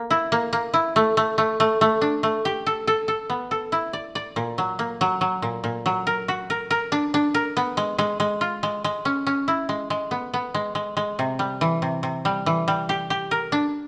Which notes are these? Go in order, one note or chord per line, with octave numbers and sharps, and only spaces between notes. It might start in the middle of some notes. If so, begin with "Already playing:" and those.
Already playing: A#3
E4
A#3
A#3
E4
A3
A3
A3
A3
A3
D4
A3
G4
A4
A4
A4
B3
A4
E4
D5
D5
A#2
F#3
A#3
F#3
F#3
A#2
A#2
F#3
A#4
F#4
A#4
A#4
D4
D4
A#4
B3
G#3
G#3
G#3
F4
G#3
G#3
C#4
C#4
E4
G#3
G#3
B3
B3
G#3
G#3
G#3
C3
G3
E3
C3
C3
G3
E3
G3
G4
G4
A#4
D4